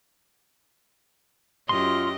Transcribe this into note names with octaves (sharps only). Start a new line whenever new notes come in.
F#2 F4 G4 D#5 C6